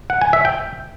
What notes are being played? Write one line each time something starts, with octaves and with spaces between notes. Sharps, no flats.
F#5
G#5
E5
G5